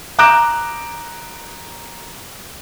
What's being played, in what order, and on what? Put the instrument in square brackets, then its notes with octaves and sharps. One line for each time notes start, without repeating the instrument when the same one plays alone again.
[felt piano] A#5 D6 F#6 G6 D7 E7